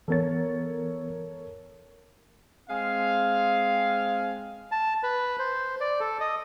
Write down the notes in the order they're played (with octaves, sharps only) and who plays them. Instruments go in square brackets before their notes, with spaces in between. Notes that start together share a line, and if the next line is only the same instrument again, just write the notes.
[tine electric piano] E3 B3 A6 [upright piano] A4 A#4 C#5
[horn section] G#3 C4 G#4 F5
[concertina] A5
B4
C5
D5
A4
D#5